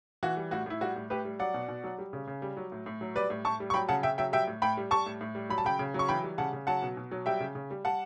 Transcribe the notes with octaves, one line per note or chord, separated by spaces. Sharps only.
E3 F#4
G3
A2 F#4
A2 E4
G3 F#4
A2
A2 G4 B4
G3
F#3 D5 F#5
B2
B2
F#3
G3
C#3
C#3
G3
F#3
A2
A2
F#3
G3 B4 D5
A2
A2 A5 C#6
G3
C#6
F#3 G5 B5
C#3 F#5 A5
C#3 E5 G5
F#3 E5 G5
G3 E5 G5
A2
A2 G5 B5
G3
G3 A5 C#6
A2
A2
G3
F#3 B5
A5
C#3 G5 B5
C#3
F#3
C#6
E3 G5 B5
G3
C#3 F#5 A5
C#3
F#3 F#5 A5
B2
B2
F#3
G3 E5 G5
C#3
C#3
G3
G3 F#5 A5